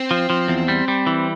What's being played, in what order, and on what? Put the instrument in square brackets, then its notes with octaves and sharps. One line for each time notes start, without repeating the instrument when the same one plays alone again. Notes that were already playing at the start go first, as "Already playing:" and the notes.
Already playing: [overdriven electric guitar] C4
[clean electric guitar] F3
F3
E2
G3
G3
E3